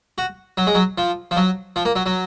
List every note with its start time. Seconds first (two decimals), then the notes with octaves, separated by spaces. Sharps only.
0.18 F#4
0.57 F#3
0.67 G#3
0.75 F#3
0.98 F3
1.31 F3
1.37 F#3
1.76 F3
1.85 A#3
1.96 F#3
2.06 F#3